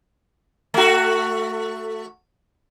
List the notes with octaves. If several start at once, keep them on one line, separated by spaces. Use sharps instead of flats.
A3 F#4